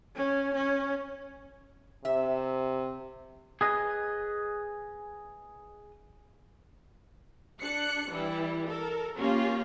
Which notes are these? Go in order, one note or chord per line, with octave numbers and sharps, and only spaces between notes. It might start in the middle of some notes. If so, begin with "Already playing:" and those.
C#4
C#4
C3 E5
G#4 B4 D#5
D4 F#6 C#7
E3 G3 E4
A4 A#4
A#3 C#4 F4 G4